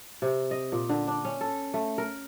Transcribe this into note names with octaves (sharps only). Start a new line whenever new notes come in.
C3
D#5
A#2
D3
D4
C#4
A4
A3
A#4